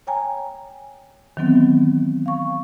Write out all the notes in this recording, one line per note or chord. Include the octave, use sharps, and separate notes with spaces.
C#5 G5 G#5 A#5
D#3 E3 F#3 B3 C4
F5 C#6